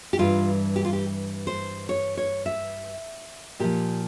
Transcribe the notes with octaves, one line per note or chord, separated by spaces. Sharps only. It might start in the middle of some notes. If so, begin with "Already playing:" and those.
G4
G2 E3 G3 F4
G4
F4
G4
C5
C#5
C#5
E5
A#2 F3 G4